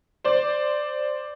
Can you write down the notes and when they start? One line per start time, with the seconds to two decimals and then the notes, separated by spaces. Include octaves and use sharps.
0.24 C5 D5